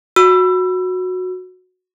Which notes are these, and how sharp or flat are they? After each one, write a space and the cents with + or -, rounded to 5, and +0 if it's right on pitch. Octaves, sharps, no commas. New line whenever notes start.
F#4 -10 E6 +25